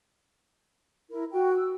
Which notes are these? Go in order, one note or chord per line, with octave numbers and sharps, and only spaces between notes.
E4 A#4
F#4 G5
E6